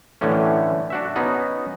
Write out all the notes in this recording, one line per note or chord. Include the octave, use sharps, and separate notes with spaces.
A2 D3 E3 A3 C#4
D4 F#4 E5
B3 C#4 D#4 F#4